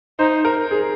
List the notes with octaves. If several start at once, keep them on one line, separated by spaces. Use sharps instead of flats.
D#4 C5
A#4
G#4